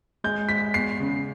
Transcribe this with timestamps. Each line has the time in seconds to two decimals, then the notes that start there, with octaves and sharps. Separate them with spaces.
0.24 G#3 G6
0.49 G#3 B6
0.74 E2 C7
1.00 C#3